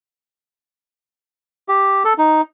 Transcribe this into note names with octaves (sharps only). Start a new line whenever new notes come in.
G4
A4
D#4